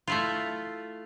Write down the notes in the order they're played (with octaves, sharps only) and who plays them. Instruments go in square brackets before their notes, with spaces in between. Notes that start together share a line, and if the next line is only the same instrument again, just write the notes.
[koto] A3 E4 F4